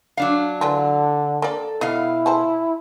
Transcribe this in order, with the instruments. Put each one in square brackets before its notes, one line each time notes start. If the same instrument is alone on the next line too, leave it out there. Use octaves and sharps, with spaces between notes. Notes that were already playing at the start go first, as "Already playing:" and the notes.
[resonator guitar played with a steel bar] F#3 D4 F5
[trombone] D3 [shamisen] E3 F4 A4
[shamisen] A#3 D5 [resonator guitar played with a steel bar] A4
[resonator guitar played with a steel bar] B2 F5 [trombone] E4 [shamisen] D#5
[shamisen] G#4 A4 C5